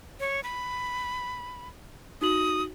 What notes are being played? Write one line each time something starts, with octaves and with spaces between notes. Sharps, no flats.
C#5
B5
D#4 F#4 D#6 F#7